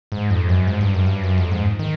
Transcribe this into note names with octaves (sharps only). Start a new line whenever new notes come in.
G#2
F2
F#2
G#2
G2
F#2
G2
F#2
F2
G#2
D#3